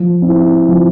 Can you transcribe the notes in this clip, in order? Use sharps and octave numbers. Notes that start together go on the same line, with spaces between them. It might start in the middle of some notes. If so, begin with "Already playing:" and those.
Already playing: F3
C4 E4
F3